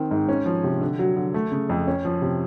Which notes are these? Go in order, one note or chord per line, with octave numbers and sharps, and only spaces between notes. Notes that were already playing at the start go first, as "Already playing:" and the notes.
Already playing: D#3 C4
G#2
C#4
F3
C3
D3
F#3
D3
A3
C#3
F2
C#4
F3
C3